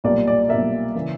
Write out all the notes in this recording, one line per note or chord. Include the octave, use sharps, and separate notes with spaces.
B1 A#2 G3 A#3 D5
D5
B1 A#2 G3 A#3 E5
C#3 E3 A#3